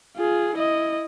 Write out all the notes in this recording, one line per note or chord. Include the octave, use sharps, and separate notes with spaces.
F4 G#4
E4 D#5